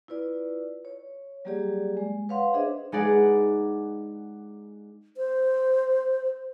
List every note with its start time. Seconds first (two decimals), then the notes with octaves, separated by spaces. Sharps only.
0.08 E4 F4 B4 D5
0.85 C#5
1.45 F#3 G3 A#3 G4 G#4 D5
1.97 G#3
2.29 B4 C#5 F5 F#5 C6
2.54 D4 G#4 C5 D#5 E5
2.92 G#3 D#4 G#4 B4 D5 F#5
5.17 C5